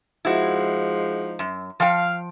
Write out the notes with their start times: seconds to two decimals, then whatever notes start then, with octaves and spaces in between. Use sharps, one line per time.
0.25 F3 G#3 D#4 E4 F#4
1.39 F#2
1.80 F3 F5 G5